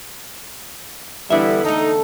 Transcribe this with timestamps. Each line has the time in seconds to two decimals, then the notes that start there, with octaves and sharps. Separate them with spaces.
1.30 E2 D3 G3 B3 E4 E5
1.64 A3 D#4 A4